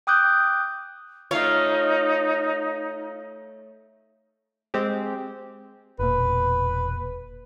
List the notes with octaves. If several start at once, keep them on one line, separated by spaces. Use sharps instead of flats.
G5 D6 D#6 F#6 G6
A3 D#4 F4 A#4 C#5 F5
G#3 C4 G4
E1 A#2 B4